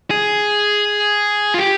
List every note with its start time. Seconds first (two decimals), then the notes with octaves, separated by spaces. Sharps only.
0.11 G#4
1.54 F4
1.59 G4